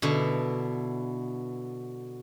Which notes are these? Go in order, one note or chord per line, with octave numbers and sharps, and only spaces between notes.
B2 D3 E4